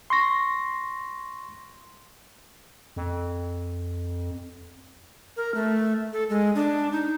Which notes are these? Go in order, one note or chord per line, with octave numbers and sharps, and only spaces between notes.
C6 C#6 A#6
F2
A#4
A3
A4
G#3
D4
D#4